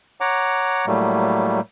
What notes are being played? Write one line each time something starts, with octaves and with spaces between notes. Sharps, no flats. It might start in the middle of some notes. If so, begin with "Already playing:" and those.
C#5 F#5 A#5 D6
A2 F#3 G3 A3 A#3